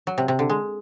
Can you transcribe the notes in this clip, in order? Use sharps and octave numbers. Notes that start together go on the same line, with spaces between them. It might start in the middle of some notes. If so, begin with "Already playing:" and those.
F#3
C3
C3
D3
G#3